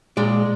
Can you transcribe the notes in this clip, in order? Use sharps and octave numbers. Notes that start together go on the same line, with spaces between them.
A#2 G#3 D5